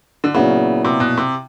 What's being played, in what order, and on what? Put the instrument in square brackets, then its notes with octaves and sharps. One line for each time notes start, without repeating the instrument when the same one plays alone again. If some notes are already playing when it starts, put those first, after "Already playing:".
[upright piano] D3
[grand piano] A#2 F#3 B3 E4 [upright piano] C#3
[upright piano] C3
B2
C3